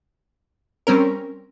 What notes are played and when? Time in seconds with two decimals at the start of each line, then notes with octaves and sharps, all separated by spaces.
0.87 G3 C4 C#4 A#4